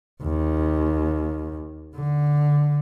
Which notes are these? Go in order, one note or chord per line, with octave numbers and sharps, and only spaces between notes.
D#2
D3